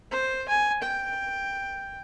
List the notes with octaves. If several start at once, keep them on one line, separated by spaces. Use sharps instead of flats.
C5
G#5
G5